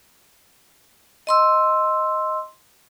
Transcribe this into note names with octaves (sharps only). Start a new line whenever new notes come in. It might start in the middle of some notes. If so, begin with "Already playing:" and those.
D#5 C6 E6